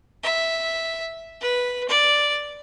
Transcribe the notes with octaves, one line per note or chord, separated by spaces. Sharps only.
E5
B4
D5